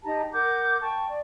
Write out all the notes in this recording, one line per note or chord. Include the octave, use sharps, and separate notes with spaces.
D#4 G4 A5 A#5
A#4 F#5 D6 G6
G5 A5 C#6
D5